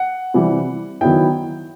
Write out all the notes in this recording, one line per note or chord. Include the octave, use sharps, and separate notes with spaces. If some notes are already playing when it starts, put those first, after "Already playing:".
Already playing: F#5
C3 E3 G3
D#3 F#3 B3 E4 G5